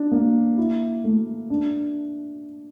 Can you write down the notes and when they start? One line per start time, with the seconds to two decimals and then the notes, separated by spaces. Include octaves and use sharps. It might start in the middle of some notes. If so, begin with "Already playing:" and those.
Already playing: D4
0.12 A#3
0.57 E4
1.04 A3
1.50 D4